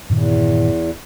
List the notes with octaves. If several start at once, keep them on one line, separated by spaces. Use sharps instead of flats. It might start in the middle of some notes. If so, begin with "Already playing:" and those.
E2 G2 A#2 D#3